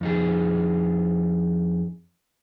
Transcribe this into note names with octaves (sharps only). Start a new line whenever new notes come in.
F2 D#4 G#4